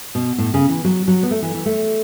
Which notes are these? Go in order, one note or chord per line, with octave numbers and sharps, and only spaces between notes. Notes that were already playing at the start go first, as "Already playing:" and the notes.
B2
A2
C#3
E3
F#3
F#3
B3
A3
E3
E3
A3